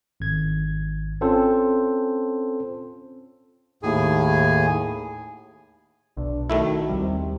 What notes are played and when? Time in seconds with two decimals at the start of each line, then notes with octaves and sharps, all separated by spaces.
0.20 G#1 G#6
1.21 C4 C#4 F4 A4 C5
3.83 D#2 A2 G#4 G#5
6.17 B1 D4
6.50 D#3 A3 E4 F#4
6.89 D#2 C3 G3